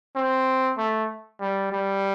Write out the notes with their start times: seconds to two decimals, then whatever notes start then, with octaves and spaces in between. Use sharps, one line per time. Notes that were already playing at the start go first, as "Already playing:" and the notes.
0.16 C4
0.78 A3
1.41 G3
1.72 G3